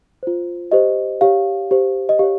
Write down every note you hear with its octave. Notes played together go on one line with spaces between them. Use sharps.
F4 C5
G4 C5 D#5
G4 C#5 F5
G4 C5
D#5
G4 C#5 F5